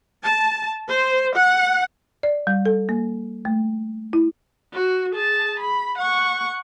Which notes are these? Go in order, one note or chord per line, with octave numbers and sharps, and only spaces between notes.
A5
C5
F#5
D5
G3
A4
A#3
A3
E4
F#4
G#4 A5
B5
F#5 C#6